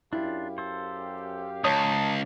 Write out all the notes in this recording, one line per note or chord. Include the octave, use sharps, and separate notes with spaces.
F#2 D4 E4 F4 G4 F5
A4 C5
C#2 C#5 A5 A#5 D#6